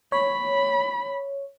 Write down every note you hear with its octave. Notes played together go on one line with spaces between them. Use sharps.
C#5 B5